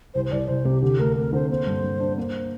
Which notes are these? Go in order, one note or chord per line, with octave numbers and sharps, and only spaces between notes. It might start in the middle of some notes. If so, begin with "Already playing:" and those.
C2 C5
C5
C2 D5
C2 C5
C3 G4
D3 G4
D2 A#4
D2 A#4
D3 C5
A#3 C5
G2
G2
D4
A#3 C5